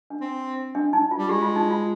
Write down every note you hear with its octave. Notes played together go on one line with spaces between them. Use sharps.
D4
C4
D4
D#4
F4
G3
G#3 G4
F4
D#4
F4